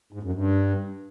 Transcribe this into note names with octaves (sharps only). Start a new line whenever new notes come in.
G#2
F#2
G2